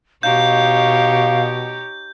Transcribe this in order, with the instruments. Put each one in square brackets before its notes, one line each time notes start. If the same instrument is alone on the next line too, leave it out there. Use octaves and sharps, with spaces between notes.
[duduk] B2 [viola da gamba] D#4 G4 C#5 [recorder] F5 [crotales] G6